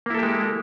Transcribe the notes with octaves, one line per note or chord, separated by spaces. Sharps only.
G#3 A#3 E4 G4 A4